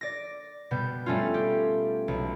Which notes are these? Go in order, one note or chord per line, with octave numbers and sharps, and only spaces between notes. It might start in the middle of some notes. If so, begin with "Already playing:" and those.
D5 A#6
B2 G3 B3 G6
G3 A3 C#4 F4
G4
B1